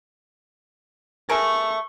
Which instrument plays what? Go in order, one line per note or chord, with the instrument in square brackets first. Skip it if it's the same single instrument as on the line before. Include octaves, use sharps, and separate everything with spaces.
[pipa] A3 G#4 A#4 [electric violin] C#6